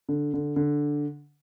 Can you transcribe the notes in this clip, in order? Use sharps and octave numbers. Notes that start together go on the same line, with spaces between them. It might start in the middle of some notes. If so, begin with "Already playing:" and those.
D3
D3
D3